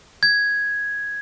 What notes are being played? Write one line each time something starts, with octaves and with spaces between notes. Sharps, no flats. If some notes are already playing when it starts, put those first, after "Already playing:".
G#6